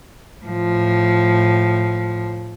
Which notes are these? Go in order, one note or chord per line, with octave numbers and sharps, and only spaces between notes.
A2 F3